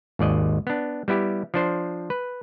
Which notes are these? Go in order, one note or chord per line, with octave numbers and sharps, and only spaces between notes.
G#1 D#2 D5 D#5
B3 D4
G3 B3 E4 G4
F3 D4 C5
B4